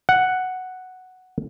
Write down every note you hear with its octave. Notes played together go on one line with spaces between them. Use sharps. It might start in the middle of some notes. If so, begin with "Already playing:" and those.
F#5